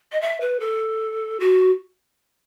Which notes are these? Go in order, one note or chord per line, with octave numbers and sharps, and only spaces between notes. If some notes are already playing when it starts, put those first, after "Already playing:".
D#5
E5
B4
A4
F#4